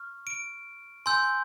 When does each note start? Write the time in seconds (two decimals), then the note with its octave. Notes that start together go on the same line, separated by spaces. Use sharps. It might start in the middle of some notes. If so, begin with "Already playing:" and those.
Already playing: C#6 F6
0.27 D7
1.06 G#5 C6 E6 G6